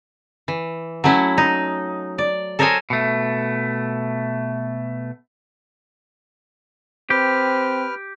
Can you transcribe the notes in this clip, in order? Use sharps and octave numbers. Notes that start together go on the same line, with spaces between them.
E3
F#3 A3 C#4 E4
D#4
D5
A4 A#4 C5 C#5 D#5 G#5
B2 A3
C4 G4 B4 F6